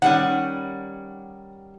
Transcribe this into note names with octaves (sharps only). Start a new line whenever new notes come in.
D#3 G3 C#4 F#5